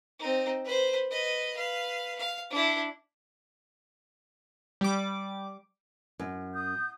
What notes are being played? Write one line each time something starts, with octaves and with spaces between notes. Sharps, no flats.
C4 D#4
B4 C5
B4 D#5
B4 F5
F5
D4 E4
G3 D6
F#2
D#6 G6